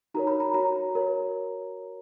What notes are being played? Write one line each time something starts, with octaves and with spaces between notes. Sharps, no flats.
D#4 F#4 A#4 C#5 A#5
B5
A#5
F#4 C#5 A#5
F#4 A#4 C#5